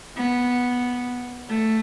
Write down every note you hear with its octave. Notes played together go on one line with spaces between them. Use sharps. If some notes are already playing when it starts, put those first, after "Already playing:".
B3
A3